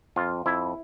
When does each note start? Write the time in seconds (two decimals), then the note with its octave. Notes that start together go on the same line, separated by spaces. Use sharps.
0.16 F2 F4
0.46 F2 E4